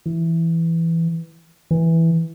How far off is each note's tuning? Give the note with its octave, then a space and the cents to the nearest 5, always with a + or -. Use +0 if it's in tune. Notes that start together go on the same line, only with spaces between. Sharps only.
E3 +5
E3 -5